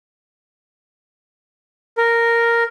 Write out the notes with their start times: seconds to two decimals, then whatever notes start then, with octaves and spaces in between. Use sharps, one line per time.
1.98 A#4